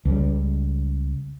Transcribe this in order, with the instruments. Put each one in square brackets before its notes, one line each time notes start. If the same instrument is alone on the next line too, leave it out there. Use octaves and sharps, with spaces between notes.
[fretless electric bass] C#2 G3